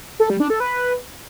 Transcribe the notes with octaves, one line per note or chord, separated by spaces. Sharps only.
A4
G3
D4
A4
B4